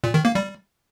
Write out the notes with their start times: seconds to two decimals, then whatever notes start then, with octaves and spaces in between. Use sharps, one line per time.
0.04 A#2
0.14 D#3
0.25 A#3
0.35 G3